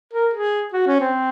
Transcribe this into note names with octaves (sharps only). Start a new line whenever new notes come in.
A#4
G#4
F#4
C#4
C4